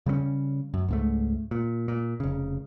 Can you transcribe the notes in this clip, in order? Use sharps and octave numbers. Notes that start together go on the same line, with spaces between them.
C#3 G3 G#3 C#4
F#2
C#2 G#2 A3
A#2
A#2
F1 C#3